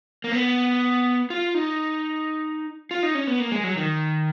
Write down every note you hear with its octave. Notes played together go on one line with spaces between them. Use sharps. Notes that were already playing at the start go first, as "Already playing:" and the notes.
A#3
B3
F4
D#4
F4
D#4
C#4
B3
A#3
G#3
F#3
D#3